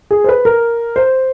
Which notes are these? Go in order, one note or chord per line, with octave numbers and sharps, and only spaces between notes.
G#4
C5
B4
A#4
C5